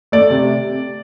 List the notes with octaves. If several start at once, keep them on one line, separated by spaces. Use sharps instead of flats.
A3 D5
C3